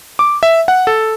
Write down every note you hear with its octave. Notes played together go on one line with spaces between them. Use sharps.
D6
E5
F#5
A4